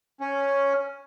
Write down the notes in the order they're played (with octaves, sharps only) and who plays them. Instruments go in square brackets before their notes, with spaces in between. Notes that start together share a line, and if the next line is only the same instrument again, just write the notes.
[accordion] C#4